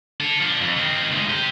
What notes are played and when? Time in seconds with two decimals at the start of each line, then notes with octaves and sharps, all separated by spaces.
0.20 D4 A4
0.40 F3 D4
0.61 F2
0.77 D#3 C4
1.12 D2 G#3
1.30 G4 C5